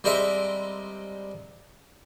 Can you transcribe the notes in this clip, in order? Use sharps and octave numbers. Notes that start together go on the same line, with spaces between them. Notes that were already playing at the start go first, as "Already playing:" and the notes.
G3 G#3 C4 A#4 D#5 E5